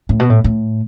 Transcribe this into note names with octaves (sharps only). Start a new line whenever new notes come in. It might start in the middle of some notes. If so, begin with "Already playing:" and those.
A2
B2
A2
A2